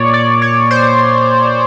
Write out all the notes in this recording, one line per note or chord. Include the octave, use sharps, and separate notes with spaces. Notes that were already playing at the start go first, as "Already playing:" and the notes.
Already playing: A#2 C#5 D5
D5
C#5
C5